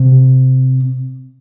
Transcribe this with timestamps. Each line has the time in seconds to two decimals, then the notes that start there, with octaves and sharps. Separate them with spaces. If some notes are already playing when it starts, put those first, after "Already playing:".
Already playing: C3